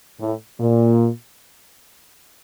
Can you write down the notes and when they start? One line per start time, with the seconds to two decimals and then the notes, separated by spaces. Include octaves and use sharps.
0.20 A2
0.60 A#2